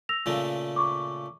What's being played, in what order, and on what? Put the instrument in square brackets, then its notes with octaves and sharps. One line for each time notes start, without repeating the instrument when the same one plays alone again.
[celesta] E6 A#6 F7
[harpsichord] A#2 C#3 A3
[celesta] C#6 D6